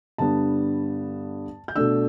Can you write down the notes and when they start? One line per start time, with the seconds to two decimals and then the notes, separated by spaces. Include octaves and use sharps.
0.18 G2 D3 G3 B3 D4 A5
1.68 G6
1.76 B2 A3 D4 E6